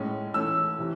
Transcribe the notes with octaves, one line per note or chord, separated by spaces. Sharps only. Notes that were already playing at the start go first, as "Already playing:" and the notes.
Already playing: A2 G#3 C#4
E3 A3 C#4 E6
C3 E3